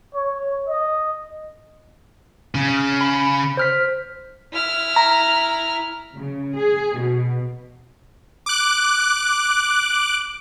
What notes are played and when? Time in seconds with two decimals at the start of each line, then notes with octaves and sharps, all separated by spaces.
0.14 C#5
0.67 D#5
2.55 C#3
2.77 F6
3.01 B5
3.57 C5 F6 B6
4.53 E4 F6
4.96 A#5
6.17 C#3
6.57 G#4
6.99 B2
8.46 D6 F#6